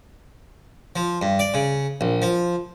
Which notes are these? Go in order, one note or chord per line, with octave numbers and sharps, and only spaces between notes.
F3
G2
D5
C#3
A#1
F3